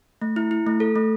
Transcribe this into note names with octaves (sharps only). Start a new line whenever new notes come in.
A3
E4
E4
A3
A4
A3